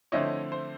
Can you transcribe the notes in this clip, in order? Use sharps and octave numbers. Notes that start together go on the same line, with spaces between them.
D3 F3 A3 C4 E4 C#5 D#5
C5